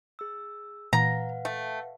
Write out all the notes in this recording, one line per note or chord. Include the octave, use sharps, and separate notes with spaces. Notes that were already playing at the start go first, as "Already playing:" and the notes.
G#4 E6
A#2 E3 B4 F5 F#5 A#5
A3